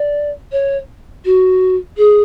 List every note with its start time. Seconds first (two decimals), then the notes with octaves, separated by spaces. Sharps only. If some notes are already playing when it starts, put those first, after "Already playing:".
Already playing: D5
0.52 C#5
1.25 F#4
1.97 G#4